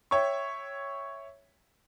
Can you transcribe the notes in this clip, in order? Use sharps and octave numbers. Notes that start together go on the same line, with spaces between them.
C#5 E5 G5 C#6